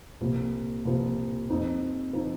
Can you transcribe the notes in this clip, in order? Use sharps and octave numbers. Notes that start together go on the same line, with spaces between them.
C2 A#2 F3
C2 A#2 F3
F2 F3 D#4
F3 D#4